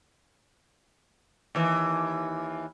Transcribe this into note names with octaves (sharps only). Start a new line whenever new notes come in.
D#2 E3